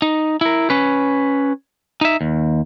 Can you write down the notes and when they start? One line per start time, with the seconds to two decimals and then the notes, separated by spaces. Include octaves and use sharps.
0.02 D#4
0.41 E4 A#4
0.70 C#4 B4
2.01 D#4 E5
2.21 D#2